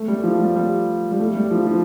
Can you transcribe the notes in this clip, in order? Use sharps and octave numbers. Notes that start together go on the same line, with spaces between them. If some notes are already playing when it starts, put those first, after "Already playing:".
Already playing: A3
G3
F3
G3
G3
G3
A3
G3
F3
F3